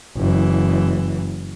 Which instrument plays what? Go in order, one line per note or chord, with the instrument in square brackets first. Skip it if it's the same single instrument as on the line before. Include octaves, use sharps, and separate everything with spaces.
[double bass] F#1 E3